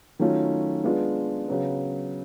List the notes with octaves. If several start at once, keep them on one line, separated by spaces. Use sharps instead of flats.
D#3 F#3 A3 C#4 F4
G#3 B3 D4 F4
C#3 F#3 B3